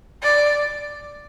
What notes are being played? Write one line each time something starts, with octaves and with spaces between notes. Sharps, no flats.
D5